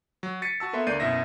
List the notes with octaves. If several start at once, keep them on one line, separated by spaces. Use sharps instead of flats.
F#3
A6 B6 C#7 D#7
F#4 A5 E6
A#3 B3 A4 E5 C6
D2 A#3 D5 G6 C7 D#7
F#2 B2 E4 E5 A#6